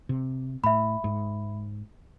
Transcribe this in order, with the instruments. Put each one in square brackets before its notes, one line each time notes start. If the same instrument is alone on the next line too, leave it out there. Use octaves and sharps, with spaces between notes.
[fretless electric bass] C3
[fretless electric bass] A2 [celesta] E5 B5
[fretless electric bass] G#2